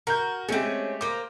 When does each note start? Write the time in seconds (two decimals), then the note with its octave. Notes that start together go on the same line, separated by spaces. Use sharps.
0.07 F#4 A#4 G6
0.49 G#3 A3 C4 C#4 G4
1.01 A#3 C5 D6